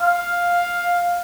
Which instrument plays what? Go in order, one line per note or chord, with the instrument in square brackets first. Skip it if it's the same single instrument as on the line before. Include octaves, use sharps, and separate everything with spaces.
[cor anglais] F5